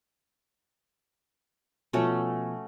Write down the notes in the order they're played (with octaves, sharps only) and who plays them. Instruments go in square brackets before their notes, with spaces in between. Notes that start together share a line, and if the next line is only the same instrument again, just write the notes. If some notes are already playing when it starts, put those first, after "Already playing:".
[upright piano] B2 F3 [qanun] A3 C#4 F#4